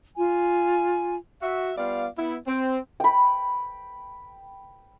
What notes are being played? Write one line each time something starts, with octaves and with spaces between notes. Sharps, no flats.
F4 G#5
F#4 E5
G3 B3 F4 D5 F5
B3 E4
C4
G5 B5